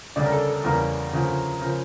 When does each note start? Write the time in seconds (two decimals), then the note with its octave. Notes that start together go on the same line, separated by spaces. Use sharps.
0.16 D2 C#3 G3 D5
0.25 A#4
0.32 A4
0.49 A4
0.64 E2 C#3 G3 A#3 A#4
1.13 D2 C#3 F3 A#3
1.61 C#3 F3 A#4